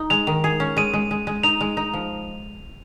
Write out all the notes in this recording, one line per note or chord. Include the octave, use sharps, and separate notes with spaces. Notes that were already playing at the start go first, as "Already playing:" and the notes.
Already playing: D#4
G#3 F7
D#3
G#4
C#4
G#3 D#7
G#3
G#3
G#3
D#4 F7
G#3
D#4
F3